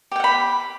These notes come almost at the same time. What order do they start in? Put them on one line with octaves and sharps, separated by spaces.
G4 G5 F#5 B5